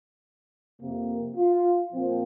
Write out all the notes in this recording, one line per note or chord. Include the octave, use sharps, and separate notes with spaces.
F2 C3 A#3
F4
A#2 F3 C4